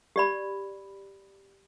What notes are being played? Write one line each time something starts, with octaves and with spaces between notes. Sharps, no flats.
G4 D5 B5